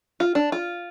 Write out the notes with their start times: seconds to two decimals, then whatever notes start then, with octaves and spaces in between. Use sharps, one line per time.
0.20 F4
0.35 D4
0.52 F4